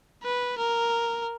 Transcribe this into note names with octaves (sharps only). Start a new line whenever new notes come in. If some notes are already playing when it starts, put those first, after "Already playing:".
B4
A#4